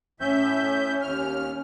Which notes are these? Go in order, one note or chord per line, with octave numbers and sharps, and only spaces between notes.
A2 C#4 E5 G6
D#2 F6